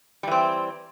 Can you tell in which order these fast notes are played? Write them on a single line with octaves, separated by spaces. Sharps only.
G3 E3 C4